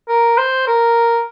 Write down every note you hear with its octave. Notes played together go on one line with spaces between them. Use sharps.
A#4
C5
A#4